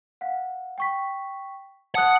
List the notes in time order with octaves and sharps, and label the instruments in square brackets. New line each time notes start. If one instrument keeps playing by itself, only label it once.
[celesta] F5 F#5
G5 C#6 B6
[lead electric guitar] F#5 [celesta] A5 D#6 F#6